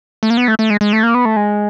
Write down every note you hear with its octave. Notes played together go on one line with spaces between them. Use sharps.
A3
A#3
B3
A3
A3
G#3
G#3
A3
A#3
B3
A3
G#3